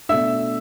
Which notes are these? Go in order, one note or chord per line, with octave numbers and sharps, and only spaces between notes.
B2 A3 D4 E5 E6